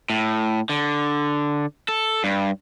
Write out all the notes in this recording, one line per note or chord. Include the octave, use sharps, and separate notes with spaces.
A2
D3
A4
G2